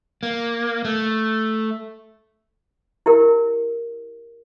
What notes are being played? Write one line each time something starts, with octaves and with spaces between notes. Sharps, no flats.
A#3
A3
E4 G4 A#4